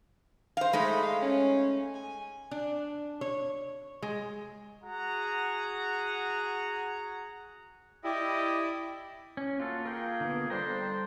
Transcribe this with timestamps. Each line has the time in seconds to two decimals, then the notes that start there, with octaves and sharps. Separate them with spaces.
0.57 C5 F5
0.73 G#3 A3 D#4 B5
1.03 F5
1.22 C#4
1.95 G#5
2.51 D4
3.21 C#5
4.02 G#3
4.83 F#4 G#4 F#5 A#5
8.04 E4 G4 D5 D#5
9.37 C#4
9.60 A#3 F4 F#4 A4
9.85 F4 G#4 A#4 G5
10.20 D3 B3
10.50 F2 G3 D4 C5 G5 A#5